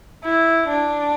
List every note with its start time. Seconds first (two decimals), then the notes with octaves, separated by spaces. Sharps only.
0.24 E4
0.69 D4